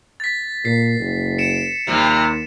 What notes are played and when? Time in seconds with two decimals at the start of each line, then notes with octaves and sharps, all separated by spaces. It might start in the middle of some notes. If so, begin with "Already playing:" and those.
0.20 A6 B6
0.65 A#2 C7
0.99 F#1
1.38 C#7 D7 E7
1.87 D#2 C3 G3 F4